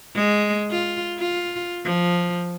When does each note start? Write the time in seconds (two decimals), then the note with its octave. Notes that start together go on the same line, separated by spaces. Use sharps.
0.15 G#3
0.71 F4
1.19 F4
1.84 F3